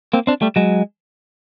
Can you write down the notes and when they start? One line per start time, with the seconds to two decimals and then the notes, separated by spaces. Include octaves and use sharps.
0.14 A#3 C4
0.27 C4 D4
0.42 G3 A3
0.56 F#3 G#3